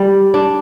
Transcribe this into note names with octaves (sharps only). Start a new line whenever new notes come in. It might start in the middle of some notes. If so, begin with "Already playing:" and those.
Already playing: G3
D4